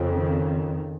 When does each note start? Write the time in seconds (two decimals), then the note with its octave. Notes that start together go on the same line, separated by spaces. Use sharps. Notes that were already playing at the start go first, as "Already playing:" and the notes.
Already playing: F2 C#3
0.10 D#3